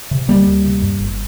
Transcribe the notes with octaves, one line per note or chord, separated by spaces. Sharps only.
C3
D2 G3 A#3
D2
C3
G2
G1